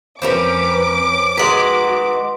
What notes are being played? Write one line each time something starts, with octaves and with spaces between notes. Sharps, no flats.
F2 C4 C#4 A#4 B4 D6
D#3 G#3 F#4 B4 F#5 C6